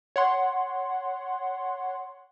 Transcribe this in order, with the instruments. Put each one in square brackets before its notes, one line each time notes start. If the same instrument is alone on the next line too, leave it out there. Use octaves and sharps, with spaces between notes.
[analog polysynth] C#5 F#5 C6